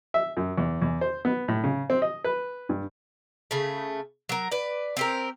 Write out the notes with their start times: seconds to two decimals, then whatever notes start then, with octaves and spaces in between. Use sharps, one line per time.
0.14 E5
0.37 F#2
0.58 E2
0.82 E2
1.01 C5
1.25 B3
1.48 A2
1.64 C#3
1.90 C4
2.02 D#5
2.24 B4
2.69 G2
3.51 C#3 A3
4.29 F#3 A#4
4.51 B4 D5
4.97 C4 G4 A#4